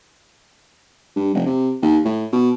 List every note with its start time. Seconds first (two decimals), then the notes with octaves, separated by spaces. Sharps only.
1.16 G2
1.34 F1
1.46 C3
1.82 D#2
2.05 A2
2.32 B2